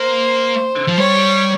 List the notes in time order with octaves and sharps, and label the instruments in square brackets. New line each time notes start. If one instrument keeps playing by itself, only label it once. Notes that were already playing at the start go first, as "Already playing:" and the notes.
Already playing: [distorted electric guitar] A#3 [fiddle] C5
[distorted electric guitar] F3
[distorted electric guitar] G3 [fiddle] C#5